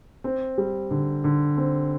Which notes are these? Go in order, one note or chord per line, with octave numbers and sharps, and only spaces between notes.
C4
G3
D3
D3
C4